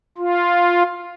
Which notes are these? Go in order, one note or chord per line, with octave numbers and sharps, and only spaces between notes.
F4